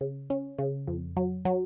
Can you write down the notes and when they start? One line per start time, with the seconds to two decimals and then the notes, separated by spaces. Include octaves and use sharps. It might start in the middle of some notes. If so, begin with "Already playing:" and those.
0.01 C#3
0.30 C#4
0.58 C#3
0.87 F2
1.17 F#3
1.45 F#3